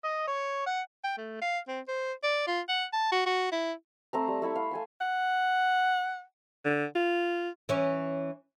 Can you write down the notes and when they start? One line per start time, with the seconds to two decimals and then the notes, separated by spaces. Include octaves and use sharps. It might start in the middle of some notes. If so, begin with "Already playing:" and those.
0.04 D#5
0.27 C#5
0.67 F#5
1.04 G5
1.18 A3
1.42 F5
1.68 C4
1.88 C5
2.24 D5
2.47 F4
2.69 F#5
2.93 A5
3.12 F#4
3.26 F#4
3.52 E4
4.13 A3 C4 A#5
4.28 G3
4.42 A3 E4 B5 C#6
4.55 F5
4.71 A3 G#5 C6
5.01 F#5
6.65 D3
6.96 F4
7.69 E3 C#4